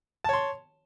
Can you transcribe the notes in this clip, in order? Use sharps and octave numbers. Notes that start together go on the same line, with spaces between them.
C#5 A5 C6